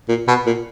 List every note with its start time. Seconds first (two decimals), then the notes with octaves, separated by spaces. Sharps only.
0.09 A#2
0.28 B2
0.46 A#2